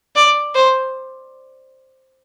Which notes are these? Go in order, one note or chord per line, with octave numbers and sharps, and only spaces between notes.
D5
C5